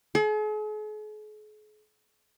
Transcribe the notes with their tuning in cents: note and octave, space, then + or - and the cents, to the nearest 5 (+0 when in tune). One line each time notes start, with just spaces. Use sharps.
G#4 +45